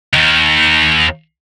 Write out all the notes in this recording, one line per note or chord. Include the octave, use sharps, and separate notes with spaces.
D#2 D#3